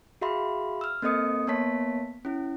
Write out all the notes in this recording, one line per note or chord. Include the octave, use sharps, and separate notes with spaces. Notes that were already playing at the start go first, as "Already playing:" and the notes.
F#4 G#4 E5 F5 B5 C6
E6 F6
A#3 C4 A4 D#5 D#6 C#7
A#3 B3 C#5 A5 B6
C#4 E4